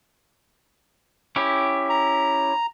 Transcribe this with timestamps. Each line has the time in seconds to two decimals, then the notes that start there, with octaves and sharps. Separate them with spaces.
1.36 C#4 E4 G4
1.89 A#5